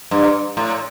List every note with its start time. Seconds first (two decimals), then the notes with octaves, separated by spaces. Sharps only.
0.11 G2
0.57 A2